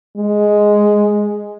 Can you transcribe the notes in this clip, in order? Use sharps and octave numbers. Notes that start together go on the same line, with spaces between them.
G#3